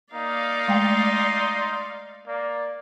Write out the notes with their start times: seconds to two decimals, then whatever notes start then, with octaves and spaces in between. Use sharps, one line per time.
0.14 A#3 D#4 D5 F5
0.68 G#3 A3 G5 C6
2.27 A#3 D5